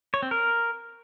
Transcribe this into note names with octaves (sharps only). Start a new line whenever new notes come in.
C#5
C4
A#4